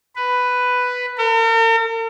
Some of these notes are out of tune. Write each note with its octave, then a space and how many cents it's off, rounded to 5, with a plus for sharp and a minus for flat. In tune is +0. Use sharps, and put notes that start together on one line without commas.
B4 +5
A#4 -45